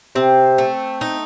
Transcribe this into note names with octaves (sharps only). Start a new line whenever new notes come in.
C3 C4
A3
D#4